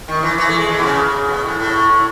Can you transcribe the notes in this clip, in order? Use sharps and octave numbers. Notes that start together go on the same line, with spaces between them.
D#3
E3
E3
A3
G#3
E3
B2
C#3
B2
A2
A2
A2